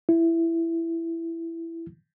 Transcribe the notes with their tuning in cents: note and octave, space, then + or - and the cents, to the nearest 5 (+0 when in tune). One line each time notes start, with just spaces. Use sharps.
E4 +10